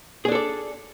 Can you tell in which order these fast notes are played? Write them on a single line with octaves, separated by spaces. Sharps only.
G#4 D4 A4 D5